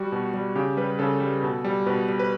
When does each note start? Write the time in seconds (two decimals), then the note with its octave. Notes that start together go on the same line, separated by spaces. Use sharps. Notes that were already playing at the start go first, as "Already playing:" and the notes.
Already playing: G3 F#4
0.12 B2
0.34 G3
0.55 C#3 G4
0.77 G3 B4
0.99 C#3 A4
1.20 G3
1.43 B2
1.64 G3
1.86 B2 B4
2.08 G3
2.19 B4